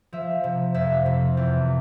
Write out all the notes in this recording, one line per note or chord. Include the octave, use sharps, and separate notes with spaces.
F3 E5
C3
F2 E5
C3
E2